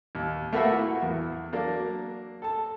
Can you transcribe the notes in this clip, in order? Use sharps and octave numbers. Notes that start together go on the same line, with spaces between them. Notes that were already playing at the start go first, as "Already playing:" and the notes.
D#2
A3 A#3 F#4 B4 E5 F5
E4 F#4
E2
F#3 A#3 D4
A4 A5